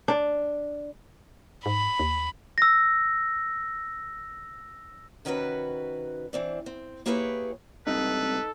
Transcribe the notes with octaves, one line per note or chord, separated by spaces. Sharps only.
D4
G#2 B5
D#2
E6 A#6
C3 D#3 C#4 F#4 G#4 B4
E3 C4 D4
C4
A#3 E4 G4 G#4 B4 C#5
C#2 G2 C3 D#4 A4 B4